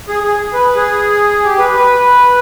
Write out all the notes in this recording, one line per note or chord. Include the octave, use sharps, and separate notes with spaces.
G#4
G#4
B4
G#4
G4
B4
B4